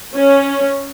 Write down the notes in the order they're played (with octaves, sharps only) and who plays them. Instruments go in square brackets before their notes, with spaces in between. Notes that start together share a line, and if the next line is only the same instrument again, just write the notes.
[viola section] C#4